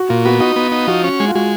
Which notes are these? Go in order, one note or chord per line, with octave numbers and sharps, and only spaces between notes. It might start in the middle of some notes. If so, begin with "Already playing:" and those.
Already playing: F#4
A#2 F4
B3 F#4
D#4 F#4
B3
D#4
F3 F#4
C#4
G#3
F4
G#3 F#4